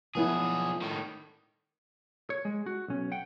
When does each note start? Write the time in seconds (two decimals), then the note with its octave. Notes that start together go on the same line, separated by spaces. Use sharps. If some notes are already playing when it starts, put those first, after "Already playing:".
0.15 B1 F3 B3 E4 G#4
0.82 A2 D#3
2.30 C#5
2.45 G#3
2.66 F#4
2.88 B1 C#4
3.12 F#5 G5